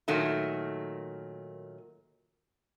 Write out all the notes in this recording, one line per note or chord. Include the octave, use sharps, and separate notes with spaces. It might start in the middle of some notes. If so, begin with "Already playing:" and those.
A#2 D#3 F#3 A3